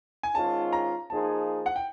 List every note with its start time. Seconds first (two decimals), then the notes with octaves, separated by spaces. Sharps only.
0.23 G#5
0.35 G#2 D#3 G#3 C#4 F4 A5
0.73 A#5
1.10 F3 A#3 D#4 G#4 A5
1.66 F#5
1.76 G5